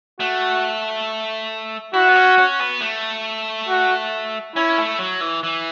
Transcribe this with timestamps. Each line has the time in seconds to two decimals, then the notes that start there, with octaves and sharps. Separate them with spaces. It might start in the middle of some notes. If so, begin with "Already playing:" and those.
0.20 A3 F#4
1.94 E4 F#4
2.08 B3
2.16 C#4
2.38 C#4
2.60 B3
2.81 A3
3.69 F#4
4.56 C#4 E4
4.78 A3
4.99 F#3
5.21 E3
5.43 E3